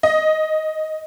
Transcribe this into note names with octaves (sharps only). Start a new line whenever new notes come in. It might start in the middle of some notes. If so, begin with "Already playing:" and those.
D#5